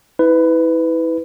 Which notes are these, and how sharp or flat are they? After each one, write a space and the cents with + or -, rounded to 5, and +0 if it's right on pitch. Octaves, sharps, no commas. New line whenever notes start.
E4 -30 B4 +20